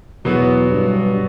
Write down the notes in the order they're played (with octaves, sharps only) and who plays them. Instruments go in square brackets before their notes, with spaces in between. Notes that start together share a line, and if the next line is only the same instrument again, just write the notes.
[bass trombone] E2 [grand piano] B2 F#3 B3 F#4
[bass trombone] G2